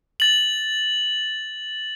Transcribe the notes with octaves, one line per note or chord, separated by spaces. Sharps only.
A6 F#7